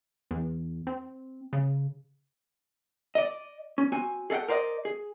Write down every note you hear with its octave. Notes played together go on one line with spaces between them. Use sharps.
E2
C4
C#3
D5 D#5
C#4
C4 F#4 G#5
G#4 A4 D5 F#5 G5
A#4 C5 D5 D#5
G#4